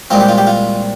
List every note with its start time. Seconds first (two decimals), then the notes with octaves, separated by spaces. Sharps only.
0.10 C2 A#2 G#3 C4 F4
0.21 G4
0.29 F4
0.38 G4
0.47 F4